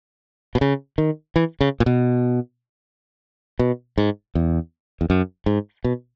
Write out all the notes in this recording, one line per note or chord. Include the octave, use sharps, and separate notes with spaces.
B2
C#3
D#3
E3
C#3
A#2
B2
B2
G#2
E2
E2
F#2
G#2
B2